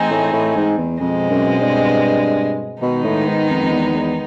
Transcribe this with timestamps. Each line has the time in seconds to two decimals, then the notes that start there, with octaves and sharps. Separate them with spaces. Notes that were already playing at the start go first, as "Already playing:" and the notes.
Already playing: E3 A3 C4 D#4 G#4
0.11 A2
0.33 A2
0.56 G#2
0.78 E2
1.00 F2 B2 G#3 C4
1.30 F#2
1.61 G2
2.81 B2 D#3 G#3 B3 D#4
3.04 A2
3.27 G#2
3.49 F2
3.62 F2
3.72 E2
3.94 E2